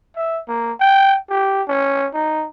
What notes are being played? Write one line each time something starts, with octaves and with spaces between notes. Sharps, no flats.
E5
A#3
G5
G4
C#4
D#4